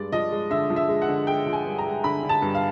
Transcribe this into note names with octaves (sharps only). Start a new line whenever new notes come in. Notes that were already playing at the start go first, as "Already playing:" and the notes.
Already playing: G2 G#3 D5
F3 D#5
G#3
D3 E5
F3
E5
G#3
F#5
D3
G#3 G5
F3
G#5
G2
A#5
G#3
D3 B5
D3
A5
G2
F5